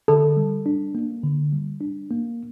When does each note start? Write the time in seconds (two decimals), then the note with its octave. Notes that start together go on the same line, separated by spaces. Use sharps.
0.08 D3 A4
0.37 G3
0.66 D4
0.95 A#3
1.23 D3
1.53 G3
1.81 D4
2.11 A#3